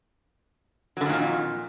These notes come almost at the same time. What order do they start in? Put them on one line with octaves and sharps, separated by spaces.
F#3 D3 D#3 A#2 F2